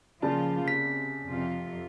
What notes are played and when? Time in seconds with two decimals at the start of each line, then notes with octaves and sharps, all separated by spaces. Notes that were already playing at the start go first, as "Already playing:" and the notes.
0.22 C#3 F3 A#3 F4 D5 A5
0.68 C3 B6
1.28 F2 C3 F4